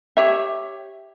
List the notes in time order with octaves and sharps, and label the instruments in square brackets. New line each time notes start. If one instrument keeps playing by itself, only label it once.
[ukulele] G4 C#5 E5